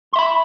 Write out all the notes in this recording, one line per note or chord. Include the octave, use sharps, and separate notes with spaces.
E5 B5 C6